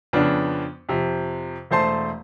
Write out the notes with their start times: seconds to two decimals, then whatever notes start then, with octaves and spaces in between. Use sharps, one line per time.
0.13 F2 C#3 B3 D4
0.89 F2 C3
1.71 E1 A3 C5 A5 C6